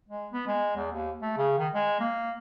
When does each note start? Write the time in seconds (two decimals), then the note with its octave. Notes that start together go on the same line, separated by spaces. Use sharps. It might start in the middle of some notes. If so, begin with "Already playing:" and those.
0.09 G#3
0.32 B3
0.47 G#3
0.76 E2
0.92 D#2
1.22 A3
1.37 C#3
1.58 D#3
1.75 G#3
2.00 A#3